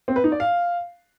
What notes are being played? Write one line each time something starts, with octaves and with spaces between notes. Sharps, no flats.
C4
B4
D#4
D5
F5